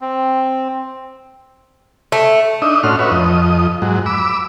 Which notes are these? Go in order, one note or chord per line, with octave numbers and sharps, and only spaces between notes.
C4
A3
D4 D#4 D#5 E5
A2 C#4 F#4 C6 F6
F#4 B4 C#5 E5
F2 D#5
G#2 F#3
B5 D6 E6